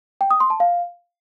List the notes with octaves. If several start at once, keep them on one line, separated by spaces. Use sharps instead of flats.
G5
D#6
C6
A5
F5